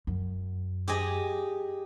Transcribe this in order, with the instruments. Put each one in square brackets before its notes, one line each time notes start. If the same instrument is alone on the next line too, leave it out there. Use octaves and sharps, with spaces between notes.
[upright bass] F#2
[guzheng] G4 G#4 D#5